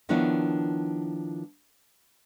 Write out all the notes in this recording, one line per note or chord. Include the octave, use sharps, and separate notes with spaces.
D#3 F3 B3 D4 E4 C#5